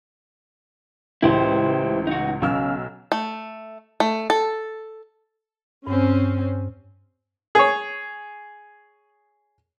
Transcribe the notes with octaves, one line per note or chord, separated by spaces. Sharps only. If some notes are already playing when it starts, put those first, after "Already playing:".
C#2 A2 E3 E4 G4 C5
D#4 F#4
B1 C#3 E6 F6
A3
A3
A4
G2 C4 C#4
G#4 C#5